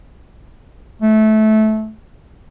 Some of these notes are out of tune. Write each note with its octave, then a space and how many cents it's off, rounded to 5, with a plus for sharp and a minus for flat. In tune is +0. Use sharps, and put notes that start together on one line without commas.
A3 -20